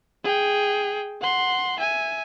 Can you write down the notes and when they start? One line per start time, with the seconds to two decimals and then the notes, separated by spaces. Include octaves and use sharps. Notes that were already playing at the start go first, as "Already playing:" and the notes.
0.24 G#4 G5
1.21 F#5 C6
1.78 E5 G#5